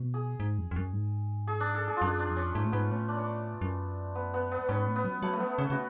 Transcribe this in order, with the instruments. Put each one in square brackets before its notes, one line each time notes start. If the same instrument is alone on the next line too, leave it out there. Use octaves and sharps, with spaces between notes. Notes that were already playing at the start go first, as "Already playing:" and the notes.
Already playing: [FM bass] B2
[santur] G#4
[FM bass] G#2
F2
F2
F#2
G#2
[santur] G#4
D4
A4
G#4
[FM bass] F#2 [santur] D4 F4
[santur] D4
[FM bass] F2
[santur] C#4
[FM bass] G#2 [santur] A3
[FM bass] A2
[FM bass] G#2 [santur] B3
[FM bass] A2 [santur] C#4
[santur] D4
C#4
D4
[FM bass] F#2
[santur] B3
B3
B3
[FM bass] G#2 [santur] C#4
[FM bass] A2
[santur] B3
[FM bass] F#3
[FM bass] F#3 [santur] A3
[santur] A3
B3
[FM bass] C#3 [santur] C#4
[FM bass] C#3 [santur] F#4